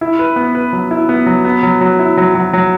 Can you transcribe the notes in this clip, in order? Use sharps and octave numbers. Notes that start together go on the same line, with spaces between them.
E4
B4
B3
B4
F#3
E4
B3
F#3
B3
F#3
F#3
E4
F#3
F#3
F#3